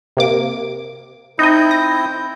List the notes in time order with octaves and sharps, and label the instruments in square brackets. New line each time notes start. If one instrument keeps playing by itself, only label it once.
[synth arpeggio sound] C3 A#3 D6
[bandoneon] C4 E4 G6 [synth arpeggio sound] D#4 D#5
[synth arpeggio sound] A#6